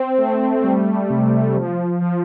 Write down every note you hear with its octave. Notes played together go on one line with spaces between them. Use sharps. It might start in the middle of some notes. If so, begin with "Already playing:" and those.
Already playing: C4
A3
G3
C3
F3
F3